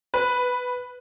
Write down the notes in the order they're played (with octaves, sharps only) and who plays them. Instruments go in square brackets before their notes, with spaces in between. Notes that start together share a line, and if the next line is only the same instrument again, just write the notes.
[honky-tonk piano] B4